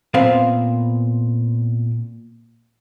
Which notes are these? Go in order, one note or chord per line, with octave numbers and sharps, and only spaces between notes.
A#2 B3 C4 C5 F5